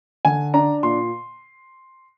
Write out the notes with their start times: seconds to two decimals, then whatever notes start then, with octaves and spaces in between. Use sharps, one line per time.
0.25 D3 G#5
0.54 D4 A#5
0.83 A#2 C6